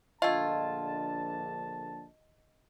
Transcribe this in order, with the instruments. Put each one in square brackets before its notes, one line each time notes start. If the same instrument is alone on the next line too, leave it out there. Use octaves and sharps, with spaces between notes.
[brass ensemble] A#1 D3 A5 [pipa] A3 F4 [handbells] D#5